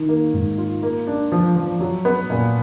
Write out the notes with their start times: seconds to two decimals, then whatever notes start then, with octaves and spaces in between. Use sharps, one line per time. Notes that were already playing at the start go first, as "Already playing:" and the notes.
Already playing: D#3
0.09 A#3
0.34 G#2
0.58 F4
0.83 A#3
1.07 D4
1.32 F3
1.56 F3
1.81 F#3
2.05 B3
2.30 A#2